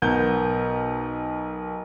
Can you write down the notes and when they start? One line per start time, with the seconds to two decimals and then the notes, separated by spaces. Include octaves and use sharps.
0.02 B1 B3 A#4 G6